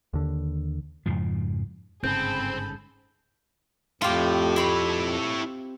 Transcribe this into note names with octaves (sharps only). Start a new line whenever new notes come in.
D#2 D3
F2 G#2 C#3 F3
G1 G#2 C#3 C4 G#4 A4 B5 G6
F2 A2 F4 G4
C4 E4 C#5 B5